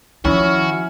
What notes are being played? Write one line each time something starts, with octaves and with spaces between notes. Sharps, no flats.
D#3 F3 C#4 E4 F#4